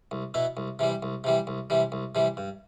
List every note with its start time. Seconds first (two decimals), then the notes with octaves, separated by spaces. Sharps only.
0.11 C2
0.34 B2 B3 E4
0.57 C2
0.79 C3 E3 G3
1.03 C2
1.24 C3 E3 G3
1.47 C2
1.70 C3 E3 G3
1.92 C2
2.15 C3 E3 G3
2.37 G2